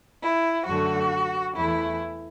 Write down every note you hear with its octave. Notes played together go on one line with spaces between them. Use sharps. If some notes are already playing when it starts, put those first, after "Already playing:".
E4
F#2 D3 A3 F#4
E2 E3 A3 E4